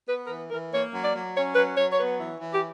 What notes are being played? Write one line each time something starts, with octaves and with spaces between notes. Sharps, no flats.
B3 B4
A#4
E3 B4
E3 A#4
A#3 C#5
F#3
D5
F#3
C#4 C#5
F#3 B4
F#3 C#5
C#5
B3 B4
E3
E3
G4